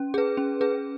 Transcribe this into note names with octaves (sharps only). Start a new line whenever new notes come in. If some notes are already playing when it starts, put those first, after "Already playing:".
Already playing: C#4
G#4 B4
C#4
G#4 B4